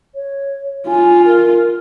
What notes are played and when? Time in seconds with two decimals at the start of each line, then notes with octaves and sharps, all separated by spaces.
0.15 C#5
0.88 F4 G#5
1.25 A#4